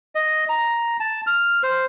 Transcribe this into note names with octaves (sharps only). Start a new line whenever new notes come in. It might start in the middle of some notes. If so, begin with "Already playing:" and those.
D#5
A#5
A5
F6
C5